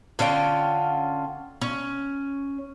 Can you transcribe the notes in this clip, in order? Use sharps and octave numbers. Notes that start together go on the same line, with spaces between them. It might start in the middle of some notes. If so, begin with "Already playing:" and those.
D3 C#4 F4 G5
C#4